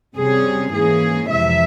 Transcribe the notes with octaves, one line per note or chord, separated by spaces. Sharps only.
C3 G3 C#4 G#4
G#2 E3 A#3 C#4 G#4
F2 C3 E3 G#3 E5